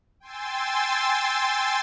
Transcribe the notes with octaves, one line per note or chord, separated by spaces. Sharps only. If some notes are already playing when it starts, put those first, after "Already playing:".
G5 G#5 C6 E6 A6